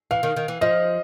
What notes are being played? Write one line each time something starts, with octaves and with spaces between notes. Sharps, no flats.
E3 F5
D#3
D#3
E3
F3 D#5